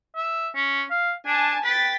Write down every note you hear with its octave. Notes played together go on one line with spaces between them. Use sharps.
E5
C#4
F5
D4 G#5 A5
B4 G5 A6 B6